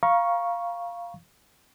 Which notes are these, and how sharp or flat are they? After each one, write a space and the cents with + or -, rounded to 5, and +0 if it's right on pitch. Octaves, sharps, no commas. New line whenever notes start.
F5 -5 A#5 +30 C#6 -5